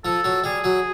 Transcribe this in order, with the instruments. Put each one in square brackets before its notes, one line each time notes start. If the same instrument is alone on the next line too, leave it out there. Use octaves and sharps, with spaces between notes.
[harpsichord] F3 [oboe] A4
[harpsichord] F#3
[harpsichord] G3 [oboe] G#4
[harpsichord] F#3